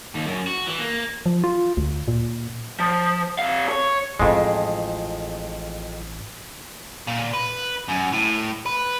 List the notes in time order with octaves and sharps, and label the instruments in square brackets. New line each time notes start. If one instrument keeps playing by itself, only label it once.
[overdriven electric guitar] D#2
F#2
F#4
E3
A#3
[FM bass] F3
F4
D2
A#2
[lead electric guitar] F3
C3 F5
C#5
[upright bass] A1 A2 [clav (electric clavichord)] F2 G#3
[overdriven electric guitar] A#2
B4
F#2
A2
B4